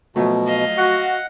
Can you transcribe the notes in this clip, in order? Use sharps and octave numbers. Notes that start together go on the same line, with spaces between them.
B2 F3 F#3 A3
D#5 F5
F#4 F#5